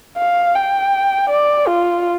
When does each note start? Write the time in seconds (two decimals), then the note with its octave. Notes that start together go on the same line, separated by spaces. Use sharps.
0.18 F5
0.55 G5
1.30 D5
1.67 F4